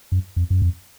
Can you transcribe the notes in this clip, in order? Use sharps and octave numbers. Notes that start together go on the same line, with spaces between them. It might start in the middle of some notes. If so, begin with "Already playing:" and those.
F#2
F2
F#2
F2